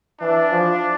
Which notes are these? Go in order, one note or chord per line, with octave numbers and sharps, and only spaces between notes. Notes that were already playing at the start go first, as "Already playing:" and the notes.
E3 D4
F3